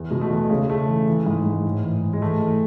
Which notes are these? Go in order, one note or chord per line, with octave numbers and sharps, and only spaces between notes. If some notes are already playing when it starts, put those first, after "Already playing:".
Already playing: E2
B2 G#3
A3
E2
C#3 G#3
C#3 A3
E3
E3
G#2
G#2
A2
E3
A2
G#3
E3 A3
E3